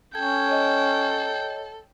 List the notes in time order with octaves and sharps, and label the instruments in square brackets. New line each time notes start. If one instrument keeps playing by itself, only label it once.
[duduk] C#4 [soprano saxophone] A4 [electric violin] G5 [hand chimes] G#6
[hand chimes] C#5 D#5